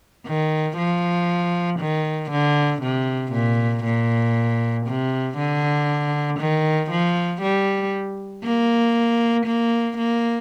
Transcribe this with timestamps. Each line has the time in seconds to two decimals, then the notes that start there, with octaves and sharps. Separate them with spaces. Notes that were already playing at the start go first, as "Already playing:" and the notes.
0.27 D#3
0.77 F3
1.80 D#3
2.31 D3
2.82 C3
3.33 A#2
3.84 A#2
4.87 C3
5.38 D3
6.40 D#3
6.91 F3
7.42 G3
8.44 A#3
9.46 A#3
9.97 A#3